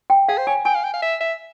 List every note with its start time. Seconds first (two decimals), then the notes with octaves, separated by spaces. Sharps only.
0.10 G5
0.28 G#4 F5
0.38 C5
0.47 C#5 G#5
0.65 G5 G#5
0.75 F5
0.84 G5
0.93 F5
1.02 E5
1.21 E5